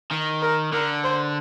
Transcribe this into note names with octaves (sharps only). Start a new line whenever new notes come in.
D#3
A#4
D3 A#4
C5